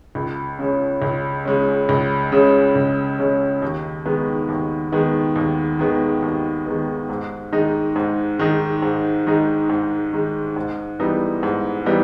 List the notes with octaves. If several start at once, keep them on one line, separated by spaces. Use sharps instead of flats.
C#2
C#3 G#3 C#4
C#2
C#3 G#3 C#4
C#2
C#3 G#3 C#4
C#2
C#3 G#3 C#4
D#2
D#3 G#3 B3
D#2
D#3 G#3 B3
D#2
D#3 G#3 B3
D#2
D#3 G#3 B3
G#2
D#3 G#3 D#4
G#2
D#3 G#3 D#4
G#2
D#3 G#3 D#4
G#2
D#3 G#3 D#4
G#2
E3 G3 B3 D#4
G#2
E3 G3 B3 D#4